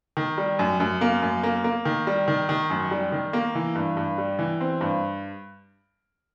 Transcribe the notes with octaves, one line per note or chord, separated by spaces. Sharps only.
D#3
G3
F#2
F#2
A#3
F#2
A#3
A#3
D#3
G3
D#3
D#3
F#2
G3
D#3
A#3
E3
G2
G2
G3
E3
C4
G2